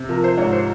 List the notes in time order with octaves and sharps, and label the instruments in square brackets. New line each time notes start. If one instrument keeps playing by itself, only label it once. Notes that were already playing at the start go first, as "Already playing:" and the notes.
Already playing: [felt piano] C3
F3 A#4
C5
G#2 C#5
C5